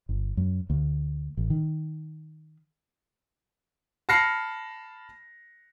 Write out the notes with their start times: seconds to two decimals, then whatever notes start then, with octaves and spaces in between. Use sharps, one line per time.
0.09 G1
0.37 F#2
0.70 D2
1.37 A1
1.50 D#3
4.09 A5 B5 F6 A#6 C7 C#7